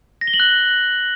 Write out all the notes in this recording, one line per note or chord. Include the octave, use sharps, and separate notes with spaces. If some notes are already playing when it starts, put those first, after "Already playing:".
A#6
G7
F#7
F#6